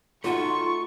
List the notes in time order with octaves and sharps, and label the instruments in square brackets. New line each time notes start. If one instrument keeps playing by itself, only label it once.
[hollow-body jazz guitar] A3 D#4 F#4 [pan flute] F4 [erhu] C#6